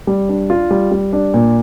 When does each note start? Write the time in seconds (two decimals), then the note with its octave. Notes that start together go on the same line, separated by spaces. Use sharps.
0.07 G3
0.29 D4
0.50 F4
0.71 G3
0.92 G3
1.13 D4
1.34 A#2